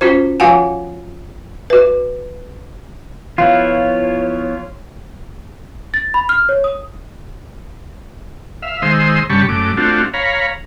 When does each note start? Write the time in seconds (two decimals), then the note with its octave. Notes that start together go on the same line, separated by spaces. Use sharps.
0.01 C#4 F4 F#4 C5
0.40 F3 F4 F#4 F5 F#5 G#5
1.70 F#4 B4
3.38 F3 B3 E4 F4 C#5 F5
5.94 A6
6.14 B5
6.29 F6
6.49 C#5
6.64 D#6
8.62 E5 F5
8.82 D#3 G#3 C5 C6 D#6 E6
9.30 G2 C#3 G3 A5 B5 C#6
9.49 F#2 A3 D6
9.77 A3 C4 D4 F4 F#4
10.14 C#5 F5 A#5 B5